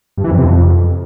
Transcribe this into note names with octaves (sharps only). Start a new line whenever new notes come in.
G2
E3
F2
C3
F2